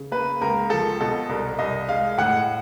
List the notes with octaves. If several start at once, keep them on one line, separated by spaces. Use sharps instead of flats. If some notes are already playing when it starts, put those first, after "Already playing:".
Already playing: C#3
A#3 B4
C#2 A#4
F3 A4
B2 A4
C2 A#4
C2 D#5
G#3 F5
A2 F#5